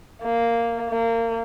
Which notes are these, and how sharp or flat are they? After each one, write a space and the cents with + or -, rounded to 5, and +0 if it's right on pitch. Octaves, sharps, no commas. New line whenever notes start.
A#3 -5
A#3 -25